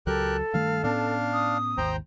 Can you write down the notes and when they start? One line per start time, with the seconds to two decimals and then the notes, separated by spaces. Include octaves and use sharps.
0.07 C#2 F#3 G4 A4 A#4 F#6
0.54 G2 D#3 A3 F5
0.84 A2 B3 C#4 D4 F5
1.33 D#6
1.78 G#1 D#2 C5 G5 A#5